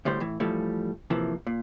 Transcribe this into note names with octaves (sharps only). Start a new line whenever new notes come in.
D2 A2 G3 C5
A2 E3
A2 E3 F3 G3 A3
C3 E3 F3 A#3
A#2